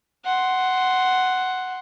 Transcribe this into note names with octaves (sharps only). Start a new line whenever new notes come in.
F#5 C6